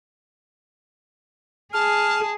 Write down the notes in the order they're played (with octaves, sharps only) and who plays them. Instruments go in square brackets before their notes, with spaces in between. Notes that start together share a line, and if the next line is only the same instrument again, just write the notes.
[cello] G#4 [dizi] A5 [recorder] F6